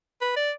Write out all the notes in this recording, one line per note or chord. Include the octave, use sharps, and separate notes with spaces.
B4
D5